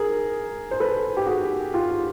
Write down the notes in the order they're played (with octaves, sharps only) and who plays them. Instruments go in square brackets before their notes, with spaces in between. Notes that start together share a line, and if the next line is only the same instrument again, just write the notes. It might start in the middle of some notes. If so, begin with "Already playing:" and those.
Already playing: [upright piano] G#4 A#4
C5
A4 B4
G4
F#4 G#4
F4 G4